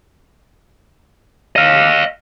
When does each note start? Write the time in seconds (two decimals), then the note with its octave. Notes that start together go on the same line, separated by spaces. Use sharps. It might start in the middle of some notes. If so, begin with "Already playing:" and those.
1.56 D#5 F5